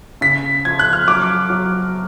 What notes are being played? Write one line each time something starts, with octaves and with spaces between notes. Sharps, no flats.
C#3 B6
F3 G#6
F#6
F6
F#3 D6
F#3